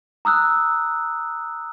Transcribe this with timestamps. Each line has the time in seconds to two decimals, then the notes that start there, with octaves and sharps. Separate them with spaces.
0.25 A#5 D#6 E6 F#6